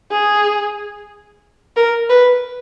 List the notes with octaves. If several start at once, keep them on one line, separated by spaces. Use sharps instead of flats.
G#4
A#4
B4